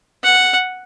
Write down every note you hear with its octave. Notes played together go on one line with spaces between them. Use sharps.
F#5